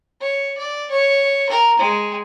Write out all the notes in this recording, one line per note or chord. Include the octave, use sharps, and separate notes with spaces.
C#5
D5
C#5
A#4
G#3